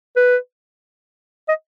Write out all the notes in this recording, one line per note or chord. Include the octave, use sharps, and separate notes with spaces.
B4
D#5